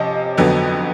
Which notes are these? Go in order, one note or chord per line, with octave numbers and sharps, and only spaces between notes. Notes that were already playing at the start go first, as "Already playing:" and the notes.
Already playing: C3 F3 C#4 D#5
F2 D3 F#3 B3